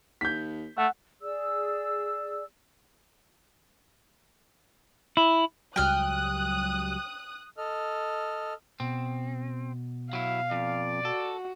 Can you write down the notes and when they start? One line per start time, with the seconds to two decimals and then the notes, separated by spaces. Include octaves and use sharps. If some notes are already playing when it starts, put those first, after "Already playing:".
0.21 D#2 G6 B6
0.78 A3 F#5
1.22 G#4 D5 E6
5.17 E4
5.76 C#2 F#3 G3 G5 D#6 F6 F#6
7.57 A4 D#5 F6
8.80 B2 C4
10.13 F#3 E4 F5
10.51 F2 D5
11.05 F#4 A4